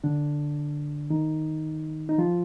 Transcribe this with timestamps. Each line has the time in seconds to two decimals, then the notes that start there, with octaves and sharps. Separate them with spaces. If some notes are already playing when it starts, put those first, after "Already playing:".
0.04 D3 D4
1.10 D#3 D#4
2.09 D#4
2.18 F3 F4